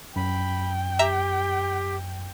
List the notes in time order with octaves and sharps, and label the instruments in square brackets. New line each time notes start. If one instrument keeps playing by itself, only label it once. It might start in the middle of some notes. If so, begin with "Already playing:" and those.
[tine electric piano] F#2 [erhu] G5 [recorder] B5
[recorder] G4 [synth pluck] E5 A#5 E6